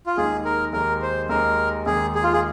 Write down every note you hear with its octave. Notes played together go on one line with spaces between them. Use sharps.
F4
D#2 D#3 G#3 D#4 G#4
A#4
D#2 D#3 G#3 D#4 A#4
C5
D#2 D#3 G#3 A#4
D#2 D#3 G#3 G#4
G#4
F4
G#4